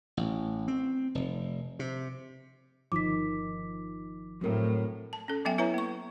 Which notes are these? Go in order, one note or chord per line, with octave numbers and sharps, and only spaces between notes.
A1
C4
F1
C3
G1 D#3 F3 D#4 D6 B6
A2 F#3 C4 A#4
A5
C#4 A4
F#3 B3 E5 G5
B3 E4 B4 C#5 E5 A#5
A#3 C#6